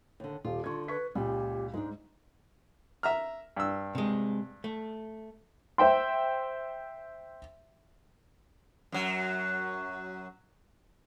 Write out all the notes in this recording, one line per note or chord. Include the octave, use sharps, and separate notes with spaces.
D#2 D3
D#1 F4 G4
D3 D#4 F4 C#6 G#6
B4 C#6 G#6 B6
C#2 A#2 G4
G#2 G#3 D4 D#4
E5 A#5 F6
G2 E6
C3 G#3
A3
C5 E5 G5 C6
F#2 F#3